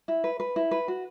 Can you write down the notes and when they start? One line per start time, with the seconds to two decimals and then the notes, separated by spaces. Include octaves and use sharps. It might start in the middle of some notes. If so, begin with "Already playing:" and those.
0.08 E4
0.24 B4
0.40 B4
0.56 E4
0.71 B4
0.88 F#4